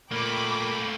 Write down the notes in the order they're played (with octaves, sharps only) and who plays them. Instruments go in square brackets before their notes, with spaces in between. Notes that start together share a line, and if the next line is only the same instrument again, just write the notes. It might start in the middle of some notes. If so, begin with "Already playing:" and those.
[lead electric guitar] A#2 [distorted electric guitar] A3 A#3 [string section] G5 B5 D6